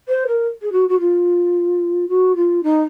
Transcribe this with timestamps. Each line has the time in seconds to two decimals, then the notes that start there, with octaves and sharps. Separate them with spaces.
0.08 C5
0.27 A#4
0.61 G#4
0.72 F#4
0.88 F#4
0.99 F4
2.08 F#4
2.35 F4
2.63 D#4